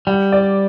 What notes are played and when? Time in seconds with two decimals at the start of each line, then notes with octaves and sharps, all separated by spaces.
0.07 G3 F#5
0.32 D5